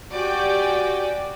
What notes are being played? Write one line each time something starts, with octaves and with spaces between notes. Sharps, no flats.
F#4 G4 D5 G5 G#5